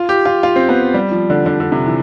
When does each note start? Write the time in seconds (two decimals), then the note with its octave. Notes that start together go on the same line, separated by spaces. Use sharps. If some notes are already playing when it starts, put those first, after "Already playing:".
Already playing: F4
0.09 G4
0.25 F4
0.43 F4
0.56 C4
0.69 B3
0.94 G3
1.12 F3
1.30 D3
1.46 D3
1.60 D3
1.72 C3
1.86 E3